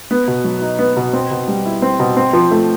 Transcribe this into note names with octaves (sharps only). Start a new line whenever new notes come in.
B3
B2
F#3
D#4
B3
B2
C4
B2
G3
E4
C4
B2
C4
F3
A3